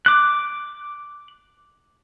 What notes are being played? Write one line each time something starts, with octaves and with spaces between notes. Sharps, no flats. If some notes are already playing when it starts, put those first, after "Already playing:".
D6 F#6